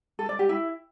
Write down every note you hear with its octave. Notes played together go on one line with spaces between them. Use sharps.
A4
D5
G4
E4